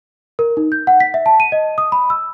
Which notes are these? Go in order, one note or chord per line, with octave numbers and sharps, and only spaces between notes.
A#4
D#4
G6
F#5
B6
E5
A5
D#7
D#5
D#6
B5
E6